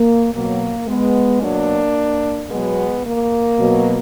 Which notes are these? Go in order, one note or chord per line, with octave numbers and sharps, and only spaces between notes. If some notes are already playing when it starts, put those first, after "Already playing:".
Already playing: A#3
B2 F#3 A#3
G#3 B3
B2 F#3 A#3 D4
B2 F#3 G#3 B3
A#3
B2 F#3